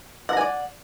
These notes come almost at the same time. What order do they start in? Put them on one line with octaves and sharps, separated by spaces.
F#5 A#5 G#5 D5